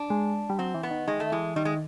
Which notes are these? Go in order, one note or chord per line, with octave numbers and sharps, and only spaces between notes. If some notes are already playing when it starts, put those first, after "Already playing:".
Already playing: D4
G#3
G3
F#3 C4
E3
B3
D#3
D#3 G#3
A3
E3 G#3
D#3 G3
G#3